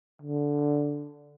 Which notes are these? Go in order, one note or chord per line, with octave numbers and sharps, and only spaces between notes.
D3